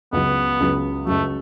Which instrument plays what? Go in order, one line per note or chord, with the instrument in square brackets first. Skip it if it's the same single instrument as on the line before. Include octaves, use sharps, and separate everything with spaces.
[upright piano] C#2 C#3 F#3 [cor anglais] B3
[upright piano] C#2 C#3 F#3
[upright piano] C#2 C#3 F#3 [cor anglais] A3